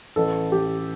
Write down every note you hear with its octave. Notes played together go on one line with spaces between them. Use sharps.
A1 A4
A1 G4